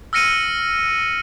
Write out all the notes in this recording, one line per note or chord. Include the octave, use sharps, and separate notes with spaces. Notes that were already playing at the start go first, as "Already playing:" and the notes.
E6 F6 A#6 C#7 D#7